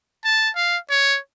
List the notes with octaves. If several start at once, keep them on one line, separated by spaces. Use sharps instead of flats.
A5
F5
C#5